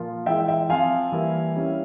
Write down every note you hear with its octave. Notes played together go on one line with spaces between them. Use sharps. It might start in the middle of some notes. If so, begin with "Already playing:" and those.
Already playing: A#2 F3 A#3 F4
E3 G#3 E4 E5 G5
E5 G5
F3 C4 F4 F5 G#5
E3 G3 A#3 E4
G3 C#4 E4